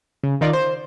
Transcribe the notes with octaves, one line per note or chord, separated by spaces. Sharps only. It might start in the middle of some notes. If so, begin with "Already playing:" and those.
C#3
D#3 D#4 F4 D5
C5